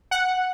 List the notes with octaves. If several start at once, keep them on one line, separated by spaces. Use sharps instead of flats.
F#5